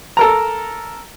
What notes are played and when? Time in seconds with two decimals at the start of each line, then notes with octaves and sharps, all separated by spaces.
0.17 A4 A#4 A#5